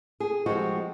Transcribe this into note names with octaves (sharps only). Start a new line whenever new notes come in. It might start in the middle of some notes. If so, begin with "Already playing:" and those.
G#4
F3 G3 G#3 C4 F#4